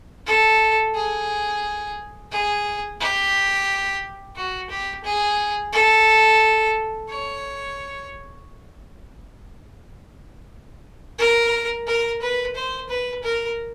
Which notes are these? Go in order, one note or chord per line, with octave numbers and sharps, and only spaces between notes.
A4
G#4
G#4
G4
F#4
G4
G#4
A4
C#5
A#4
A#4
B4
C5
B4
A#4